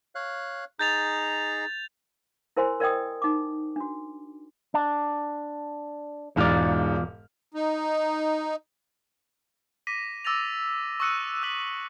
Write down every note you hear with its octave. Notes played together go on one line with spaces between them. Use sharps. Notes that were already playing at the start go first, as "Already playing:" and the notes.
C#5 F5 F#6
D#4 G#4 A#5 G6 A6 F7
E4 A#4 C5 G#5 C6
A#4 D5 D#5 G5 D#6
D#4 D6
D4 F#4
D4
E1 E2 G#2 F4 D5 F6
D#4
D6 A#6 B6 D#7
D6 E6 A6 A#6 F7
C#6 D#6 E6 F#6 C#7 D#7
E6 F#6 B6 F#7